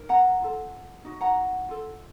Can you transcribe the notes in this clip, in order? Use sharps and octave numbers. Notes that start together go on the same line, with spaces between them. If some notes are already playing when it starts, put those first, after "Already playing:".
Already playing: D#4 A#4
F#5 A#5
F4 A4
D#4 F#4
F#5 A#5
F4 A4